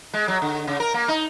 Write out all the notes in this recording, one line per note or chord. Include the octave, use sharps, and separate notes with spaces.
G#3
F#3
D3
C#3
A#4
A#3
D#4